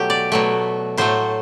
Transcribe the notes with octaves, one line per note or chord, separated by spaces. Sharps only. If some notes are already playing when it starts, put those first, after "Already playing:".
Already playing: B2 F#3 A3 G4
D5
B2 F#3 A3
A2 F#3 A3 C5